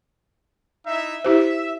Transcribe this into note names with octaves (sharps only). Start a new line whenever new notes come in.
D#4 E4 E5
E4 G4 C5 E5